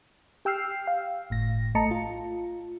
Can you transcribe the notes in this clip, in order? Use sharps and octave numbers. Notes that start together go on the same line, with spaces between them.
G4 G5 E6 F6 C7
F5
G1 A2 A#6
A#1 A3 D#5 A5 A#5 C#7
F4